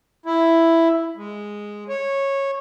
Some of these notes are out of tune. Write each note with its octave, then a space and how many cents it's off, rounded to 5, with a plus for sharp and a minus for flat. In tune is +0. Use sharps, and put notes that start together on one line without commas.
E4 +5
G#3 -5
C#5 -15